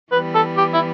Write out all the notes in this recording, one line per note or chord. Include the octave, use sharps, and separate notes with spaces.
E3 G3 B3 B4
A4
G4
E4